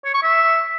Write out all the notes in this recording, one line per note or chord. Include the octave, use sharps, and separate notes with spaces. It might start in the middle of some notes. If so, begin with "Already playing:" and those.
C#5
C#6
E5